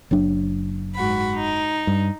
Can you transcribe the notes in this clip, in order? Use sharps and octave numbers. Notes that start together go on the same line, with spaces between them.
F#1 F#3 D4
G#2 F#4 B5
D#4
G2